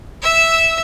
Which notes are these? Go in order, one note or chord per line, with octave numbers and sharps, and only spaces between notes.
E5 E6